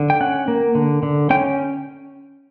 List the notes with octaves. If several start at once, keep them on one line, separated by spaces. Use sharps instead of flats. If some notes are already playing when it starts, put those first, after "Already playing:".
Already playing: D3
G5
C#4 F#5
A#3
D3
D3
C#4 G5